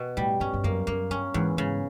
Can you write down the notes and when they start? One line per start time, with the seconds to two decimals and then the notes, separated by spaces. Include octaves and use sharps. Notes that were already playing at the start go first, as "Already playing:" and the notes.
Already playing: B2
0.17 A2 G3
0.40 G2 C#4
0.54 G2
0.64 F#2 A#3
0.87 F#2 A#3
1.10 G2 C#4
1.34 E2 G#2
1.57 G#2 C#3